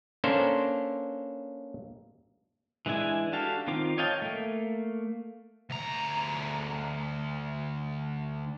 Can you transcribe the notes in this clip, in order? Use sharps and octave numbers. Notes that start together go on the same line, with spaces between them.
A#3 C#4 D4 A4 C5
E3 G#3 D4 E4 G#5
D4 F#4 G4 A4 F5
D#3 C4 F4 D6
C#5 D#5 F5 G5 A5
A3 A#3
D2 A#5